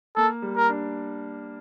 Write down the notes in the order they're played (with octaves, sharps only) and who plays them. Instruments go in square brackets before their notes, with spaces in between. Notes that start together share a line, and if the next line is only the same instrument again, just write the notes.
[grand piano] A#3 [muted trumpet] A4
[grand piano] G3
[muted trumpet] A#4
[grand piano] D4